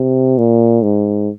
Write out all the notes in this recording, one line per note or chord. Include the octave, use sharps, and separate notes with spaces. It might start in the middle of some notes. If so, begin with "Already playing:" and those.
Already playing: C3
A#2
G#2